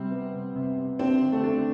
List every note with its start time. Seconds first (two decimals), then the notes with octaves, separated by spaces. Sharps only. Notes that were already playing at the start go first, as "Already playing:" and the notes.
Already playing: C3 G3 C4
0.11 B3
0.33 C3
0.56 C3
0.77 C3
0.99 C4 D4
1.21 D3
1.32 A3
1.43 D4